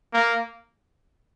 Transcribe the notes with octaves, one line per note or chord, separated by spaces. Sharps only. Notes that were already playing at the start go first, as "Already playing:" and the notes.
A#3